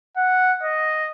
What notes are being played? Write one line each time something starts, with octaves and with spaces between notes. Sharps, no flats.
F#5
D#5